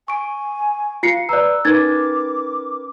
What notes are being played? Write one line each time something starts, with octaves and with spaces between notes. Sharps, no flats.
G#5 C#6 D7
F4 F5 C7 C#7
B4 D5 A#5 E6 F#6
C#4 D#4 A#4 B4 D6 G#6 A6